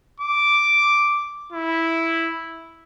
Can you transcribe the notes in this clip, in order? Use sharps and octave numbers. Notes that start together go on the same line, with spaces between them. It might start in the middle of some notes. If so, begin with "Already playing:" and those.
D6
E4